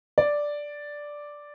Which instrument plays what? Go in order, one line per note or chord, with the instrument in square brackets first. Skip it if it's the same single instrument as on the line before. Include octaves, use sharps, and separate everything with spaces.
[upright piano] D5